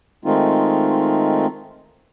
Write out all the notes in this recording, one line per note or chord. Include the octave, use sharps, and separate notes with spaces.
D#3 G#3 A3 C4 D#4 F4